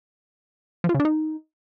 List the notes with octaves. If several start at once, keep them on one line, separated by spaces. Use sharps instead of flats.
F3
F4
C#3
D4
D#4